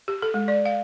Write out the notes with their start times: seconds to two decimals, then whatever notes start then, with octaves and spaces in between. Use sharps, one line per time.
0.08 G4
0.22 A4
0.34 G#3
0.48 D5
0.66 F5